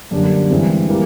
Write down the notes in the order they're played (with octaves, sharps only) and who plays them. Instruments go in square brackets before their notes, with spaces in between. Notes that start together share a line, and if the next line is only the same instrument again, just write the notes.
[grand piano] F#2 D3 G3 A#3 D4
G2 E3 G#3 C4
E3 G3 A#3